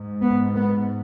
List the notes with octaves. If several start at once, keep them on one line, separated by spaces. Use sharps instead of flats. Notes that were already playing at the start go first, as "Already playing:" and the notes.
Already playing: G#2
B3
B3